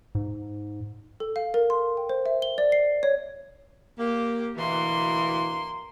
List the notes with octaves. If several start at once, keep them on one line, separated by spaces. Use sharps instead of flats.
G#2
A4
F5
A#4
C6
G5
C5
E5
G7
D5
C7
C#5
A#3 G4
D2 B2 E3 A#3 C6